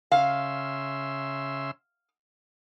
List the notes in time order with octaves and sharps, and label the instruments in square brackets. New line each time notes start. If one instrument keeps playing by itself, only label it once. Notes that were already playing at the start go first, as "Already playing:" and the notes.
[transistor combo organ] C#3 E5 C6 [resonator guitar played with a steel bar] F5